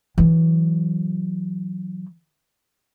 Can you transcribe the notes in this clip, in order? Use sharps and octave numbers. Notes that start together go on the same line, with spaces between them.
E3 F#3